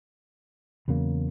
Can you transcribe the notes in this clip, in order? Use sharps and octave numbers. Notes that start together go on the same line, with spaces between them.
E2 C#3 F#3 A#3